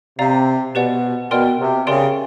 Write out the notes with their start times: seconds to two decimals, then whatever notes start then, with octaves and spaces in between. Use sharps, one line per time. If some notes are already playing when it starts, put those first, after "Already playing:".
0.19 C3 D5 F5 A#5
0.74 B2 G4 B4 D5 F#5
1.30 B2 A#4 D5 G5 C6 F6
1.60 C3
1.87 C#3 G4 A#4 D5 G5 C6